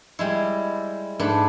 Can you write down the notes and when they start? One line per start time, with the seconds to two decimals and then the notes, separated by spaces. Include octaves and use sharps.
0.19 G3 G#3 E4
1.19 G#2 A3 D4 B4